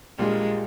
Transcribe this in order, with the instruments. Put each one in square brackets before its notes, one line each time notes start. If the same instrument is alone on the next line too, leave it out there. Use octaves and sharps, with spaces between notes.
[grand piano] A#1 A#2 G3 A#3 F4 [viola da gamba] G#3